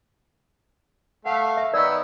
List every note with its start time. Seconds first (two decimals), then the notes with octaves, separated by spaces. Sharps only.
1.26 A3 F5 F#5
1.57 E5
1.74 D#3 B3 D5 D#5 E6